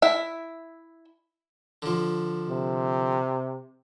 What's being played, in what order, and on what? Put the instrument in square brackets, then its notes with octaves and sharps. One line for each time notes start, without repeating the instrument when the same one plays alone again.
[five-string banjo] E4 E5
[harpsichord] D3 F3
[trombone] C3